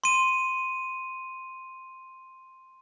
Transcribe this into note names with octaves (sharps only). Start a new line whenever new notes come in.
C6 D#7